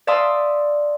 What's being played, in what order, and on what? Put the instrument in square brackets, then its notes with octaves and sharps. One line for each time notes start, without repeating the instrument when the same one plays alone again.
[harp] D5 E5 F5 A5 C6 D#6